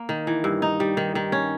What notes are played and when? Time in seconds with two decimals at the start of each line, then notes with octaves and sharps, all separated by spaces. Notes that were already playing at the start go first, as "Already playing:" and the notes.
Already playing: A#3
0.09 D#3
0.27 E3
0.44 G2
0.62 D#4
0.80 G3
0.97 D#3
1.15 D#3
1.32 C#4